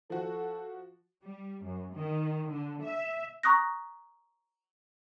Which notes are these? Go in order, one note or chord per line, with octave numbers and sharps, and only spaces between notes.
F3 F#4 A4
G3
F#2
D#3
D3
E5
A#5 C#6 D#6 F#6 A#6